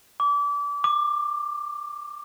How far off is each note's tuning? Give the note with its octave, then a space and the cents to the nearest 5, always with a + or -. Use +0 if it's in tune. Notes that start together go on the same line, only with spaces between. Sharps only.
D6 -30
D6 +20